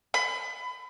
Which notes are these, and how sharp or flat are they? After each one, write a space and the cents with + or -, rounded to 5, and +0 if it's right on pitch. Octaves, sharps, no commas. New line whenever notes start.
B5 +30